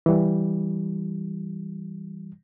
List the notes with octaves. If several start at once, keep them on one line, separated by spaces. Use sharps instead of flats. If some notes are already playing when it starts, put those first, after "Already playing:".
E3 G3